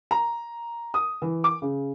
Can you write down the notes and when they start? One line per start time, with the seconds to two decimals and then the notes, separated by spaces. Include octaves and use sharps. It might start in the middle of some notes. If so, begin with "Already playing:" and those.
0.11 A#5
0.94 D#6
1.22 E3
1.44 D6
1.62 C#3